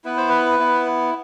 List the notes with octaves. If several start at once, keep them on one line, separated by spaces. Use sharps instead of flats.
B3 E4 B4
C5
B4
B3 E4